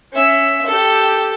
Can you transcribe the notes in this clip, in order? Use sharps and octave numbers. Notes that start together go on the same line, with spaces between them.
C#4 E5
G4 A4